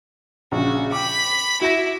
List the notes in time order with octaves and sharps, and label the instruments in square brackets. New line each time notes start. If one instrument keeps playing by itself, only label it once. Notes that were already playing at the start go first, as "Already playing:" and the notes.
[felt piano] A#1 C#3 [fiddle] F#4
[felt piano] G5 D6 [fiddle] B5
[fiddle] E4 [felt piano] F#4 A#6